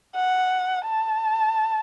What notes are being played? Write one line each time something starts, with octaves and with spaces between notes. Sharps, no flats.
F#5
A5